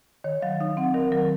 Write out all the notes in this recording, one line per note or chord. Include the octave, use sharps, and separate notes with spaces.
D#3 C#5
F#3 F5
D#4 F5
C4 F#5
D#3 A#4
F#3 A#4